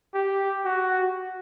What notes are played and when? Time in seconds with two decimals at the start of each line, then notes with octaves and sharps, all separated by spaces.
0.14 G4
0.65 F#4